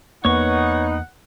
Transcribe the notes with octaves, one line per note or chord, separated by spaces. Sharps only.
E2 A#3 B3 D#4 C#5 F#5 C#6